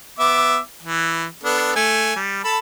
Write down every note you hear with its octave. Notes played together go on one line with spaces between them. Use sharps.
B3 E5 D6
E3
B3 D4 A4
A3 G#5
G3
A4 A5 B5